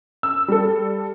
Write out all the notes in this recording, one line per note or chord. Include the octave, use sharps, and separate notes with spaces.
E6
G3 A4